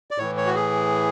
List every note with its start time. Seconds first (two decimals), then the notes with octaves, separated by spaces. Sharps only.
0.11 D5
0.18 A2 E3 C#5
0.37 C#5
0.46 F#4
0.55 G#4